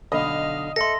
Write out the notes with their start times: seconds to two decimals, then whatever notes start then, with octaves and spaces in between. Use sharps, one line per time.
0.12 B1 D3 D#5 F5 B5
0.76 A4 D#5 E5 C6 A#6 C#7